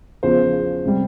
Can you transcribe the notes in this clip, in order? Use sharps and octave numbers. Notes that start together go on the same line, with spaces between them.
E2 C#3 F3 C5
C3 G3